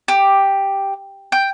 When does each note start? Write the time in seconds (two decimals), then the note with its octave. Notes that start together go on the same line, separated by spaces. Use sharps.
0.08 G4
1.32 G5